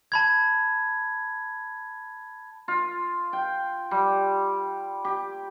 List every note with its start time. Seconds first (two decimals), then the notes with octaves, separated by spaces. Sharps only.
0.12 A5 B5 G#6
2.68 F4
3.33 G5
3.91 G3
5.05 G4